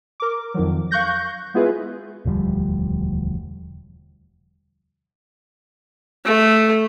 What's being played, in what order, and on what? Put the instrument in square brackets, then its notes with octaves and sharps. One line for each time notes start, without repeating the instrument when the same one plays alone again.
[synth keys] A#4 D6
F2 D#3 F3 F#3
F5 C#6 F#6 G6 A#6
G#3 B3 E4 F4 G#4 B4
[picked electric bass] E1 D2 F3 G3
[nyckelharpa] A3